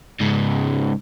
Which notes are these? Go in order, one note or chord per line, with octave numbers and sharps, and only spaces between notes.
G#2 C#3